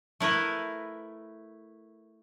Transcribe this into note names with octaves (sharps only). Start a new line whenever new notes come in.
A3 E4 A#4 B4